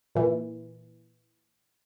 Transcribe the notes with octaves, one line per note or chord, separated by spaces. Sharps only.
A#2 E3